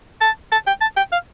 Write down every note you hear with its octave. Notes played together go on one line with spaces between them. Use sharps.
A5
A5
G5
A5
G5
F5